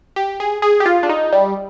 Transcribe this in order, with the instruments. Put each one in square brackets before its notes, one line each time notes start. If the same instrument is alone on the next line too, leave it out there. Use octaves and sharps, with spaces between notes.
[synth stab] G4
G#4
G#4
G4
F4
D4
D#4
G3